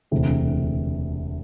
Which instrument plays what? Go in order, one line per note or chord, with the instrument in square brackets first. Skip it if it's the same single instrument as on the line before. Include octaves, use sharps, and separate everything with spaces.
[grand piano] E1 D2 C3 E3